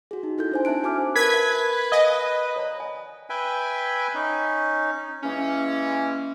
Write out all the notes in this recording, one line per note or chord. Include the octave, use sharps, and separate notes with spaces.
F#4 G#4
D#4
D#4 E4 A4 G6
D4 C5 G#5
C4 E5 A5 F#6 D7
F#4 G#5 D6 F6
A#4 B4 A5 G#6 B6
E5
D#5 F5 G#5
C#5 D5 A#5
D#5 G#5
B4 E5 G5 G#5
C#4 D#4
E3 G#3 A#3 C#4